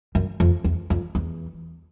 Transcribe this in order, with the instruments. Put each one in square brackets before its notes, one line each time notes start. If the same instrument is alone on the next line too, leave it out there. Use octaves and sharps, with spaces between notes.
[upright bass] F#2
F2
E2
F2
E2